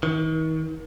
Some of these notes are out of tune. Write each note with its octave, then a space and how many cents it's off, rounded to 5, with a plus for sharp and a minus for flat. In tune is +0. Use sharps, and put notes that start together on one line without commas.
D#3 +40